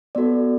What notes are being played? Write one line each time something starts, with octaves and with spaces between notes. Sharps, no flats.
B3 F#4 A4 D5